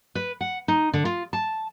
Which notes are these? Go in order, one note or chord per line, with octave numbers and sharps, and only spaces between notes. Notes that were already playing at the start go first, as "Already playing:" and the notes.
B4
F#5
D#4
D3
F4
A5